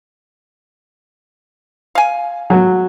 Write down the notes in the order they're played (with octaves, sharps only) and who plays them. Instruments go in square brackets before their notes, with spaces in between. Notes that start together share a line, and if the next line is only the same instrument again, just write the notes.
[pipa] F5 G#5
[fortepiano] F#3